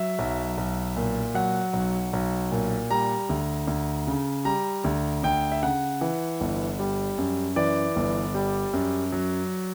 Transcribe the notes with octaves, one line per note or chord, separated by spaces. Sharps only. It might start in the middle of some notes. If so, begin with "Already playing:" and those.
Already playing: F#3 E5
B1
B1
A#2
F#3 F#5
B1
B1
A#2
G3 A#5
D2
D2
C#3
G3 A#5
D2
D2 G5
E5
C#3 F#5
E3
G1
G3
F#2
E3 D5
G1
G3
F#2
F#3